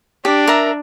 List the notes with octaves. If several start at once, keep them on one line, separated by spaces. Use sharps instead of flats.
D4 G4
A#4 E5 A#5